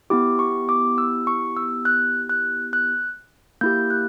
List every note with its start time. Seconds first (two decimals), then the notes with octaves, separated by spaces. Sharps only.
0.10 B3 E4 G4 D6
0.39 C#6
0.69 D6
0.98 E6
1.27 C#6
1.57 E6
1.85 F#6
2.30 F#6
2.73 F#6
3.61 A#3 E4 G4 G6
3.90 F#6